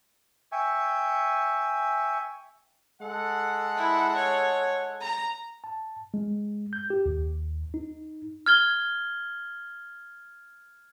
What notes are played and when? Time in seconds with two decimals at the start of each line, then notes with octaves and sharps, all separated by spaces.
0.52 E5 G5 G#5 C#6
3.02 G#3 A4 F#5
3.78 E4
4.16 C#5
5.01 A#5
5.64 A5
6.14 G#3
6.73 G6
6.90 G4
7.06 D#2
7.74 D#4
8.46 F6 G#6 G7